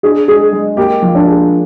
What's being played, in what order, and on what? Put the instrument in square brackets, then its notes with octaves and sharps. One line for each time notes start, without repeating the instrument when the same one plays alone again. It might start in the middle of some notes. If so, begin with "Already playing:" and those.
[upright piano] D4 [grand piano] G#4
[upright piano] G#3 [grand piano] G#4
[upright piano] G#3
[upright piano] A#3 [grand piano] G4
[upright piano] F3
[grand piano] D4
[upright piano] G#4